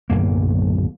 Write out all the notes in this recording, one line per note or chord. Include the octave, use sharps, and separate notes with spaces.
D1 B1 F#2 A#3